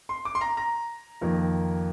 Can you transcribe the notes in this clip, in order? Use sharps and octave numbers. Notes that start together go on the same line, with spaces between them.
C6
D6
C6
A#5
A#5
F2 D#3 A#3